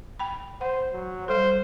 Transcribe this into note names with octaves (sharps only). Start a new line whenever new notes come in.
G5 B5
C5 F#5
F#3
G3 A4 C5